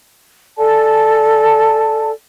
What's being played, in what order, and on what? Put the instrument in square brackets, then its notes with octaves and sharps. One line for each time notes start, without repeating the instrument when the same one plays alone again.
[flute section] A4 D5 G#5 A5